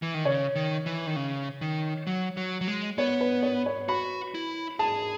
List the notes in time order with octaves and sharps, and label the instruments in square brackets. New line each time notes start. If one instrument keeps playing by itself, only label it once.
[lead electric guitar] E3
D#3
[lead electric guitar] C#3 [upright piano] C#5
[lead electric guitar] D#3
E3
D#3
C#3
D#3
F#3
F#3
F#3
G#3
[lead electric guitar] B3 [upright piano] C#5
[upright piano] B4
C#5
C#5
[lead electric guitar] F#4 [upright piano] B5
[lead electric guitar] E4
[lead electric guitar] G#4 [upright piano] A5